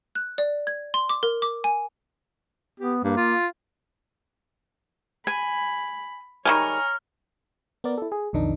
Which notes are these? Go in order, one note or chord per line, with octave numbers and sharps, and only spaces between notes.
F#6
D5
G#6
C6
D6
A#4
D6
G#5
B3 G4
G2 A#3
F4
G#5 B5
D#3 G3 G#3 C#5 G#5 A#5 F6
B3 A#4 D5
E4 A4
G#4
B1 F2 D#3 D4 D#4